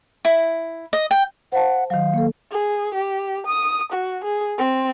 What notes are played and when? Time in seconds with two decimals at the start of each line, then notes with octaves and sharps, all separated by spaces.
0.25 E4
0.93 D#5
1.11 G5
1.52 C5 F5 F#5 A5
1.90 D#3 F#3 F5
2.14 A#3 A4
2.52 G#4
2.94 G4
3.47 D#6
3.93 F#4
4.24 G#4
4.58 C4